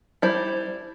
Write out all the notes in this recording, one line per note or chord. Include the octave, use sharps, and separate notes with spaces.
G3 E4 C5